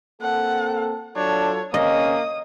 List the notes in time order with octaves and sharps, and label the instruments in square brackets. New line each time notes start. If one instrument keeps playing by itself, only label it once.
[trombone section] A#3 C4 A4 [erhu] F#5
[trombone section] F#3 F4 A4 [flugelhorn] D4 [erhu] C#5
[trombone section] C#3 C4 C#4 [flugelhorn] A#3 [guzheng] D#5 [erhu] D#6